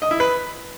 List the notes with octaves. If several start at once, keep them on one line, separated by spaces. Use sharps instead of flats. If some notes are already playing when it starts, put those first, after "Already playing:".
D#5
E4
B4